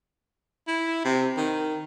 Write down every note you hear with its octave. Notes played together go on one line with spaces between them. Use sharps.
E4
C3
D#3